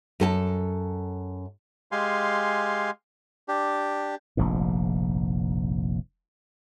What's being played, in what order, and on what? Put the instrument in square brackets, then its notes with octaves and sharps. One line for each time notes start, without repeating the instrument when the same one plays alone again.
[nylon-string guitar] F#2 A4 G#5 A5
[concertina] G#3 G4 F5 G#5 C6
D4 G4
[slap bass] F1 A#1 G#2